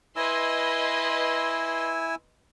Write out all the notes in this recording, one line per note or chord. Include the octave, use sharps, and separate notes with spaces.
E4 B4 D#5 G#5 C6 E6